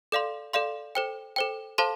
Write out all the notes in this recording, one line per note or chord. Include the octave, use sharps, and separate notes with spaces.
A4 D5 F5 C6
A4 D5 F5 C6
A4 C5 G5
A4 C5 G5
A4 C5 F5 A5 C6